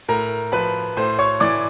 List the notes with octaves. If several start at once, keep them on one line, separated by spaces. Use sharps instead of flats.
A2 A#4 A#5
F3 B4 B5
A2 C5 C6
C#5 C#6
E3 D5 D6